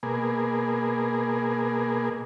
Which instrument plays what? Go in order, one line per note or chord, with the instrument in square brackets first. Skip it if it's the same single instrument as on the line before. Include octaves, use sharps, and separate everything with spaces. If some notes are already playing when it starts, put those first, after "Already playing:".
[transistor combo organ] B2 A#3 G#4